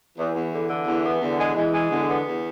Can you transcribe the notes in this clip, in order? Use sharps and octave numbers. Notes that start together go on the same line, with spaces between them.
E2 E3
E2
D3 E3
D3
E2 E3
B3
E2 D3
G#3
E3 G#3
G#3
E2 D3
B3
E2